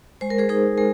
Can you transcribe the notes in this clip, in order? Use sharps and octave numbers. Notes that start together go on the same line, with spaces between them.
G#3 C5
A#4
G#4 C5
D#4 G#4 C5
G#3 A#4